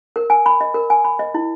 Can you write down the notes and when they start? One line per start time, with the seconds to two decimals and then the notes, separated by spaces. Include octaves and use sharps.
0.16 A#4
0.30 G#5
0.46 B5
0.61 D#5
0.74 A#4
0.90 G#5
1.05 B5
1.19 D#5
1.35 E4